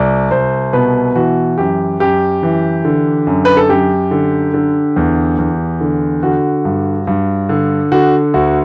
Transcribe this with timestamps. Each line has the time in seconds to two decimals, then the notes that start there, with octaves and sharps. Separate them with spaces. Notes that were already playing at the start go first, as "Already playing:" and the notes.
Already playing: C2 D5
0.31 C2 C5
0.73 B2 B4
1.16 E3 F#4
1.58 F#2 G4
2.00 F#2 G4
2.43 E3
2.85 D3
3.27 F#2
3.45 B4
3.57 A4
3.69 F#2 G4
4.11 D3
4.54 D3
4.96 E2
5.38 E2
5.81 D3
6.23 D3 F#4
6.65 G2
7.07 G2
7.49 D3
7.92 D3 F#4
8.34 D2 F#4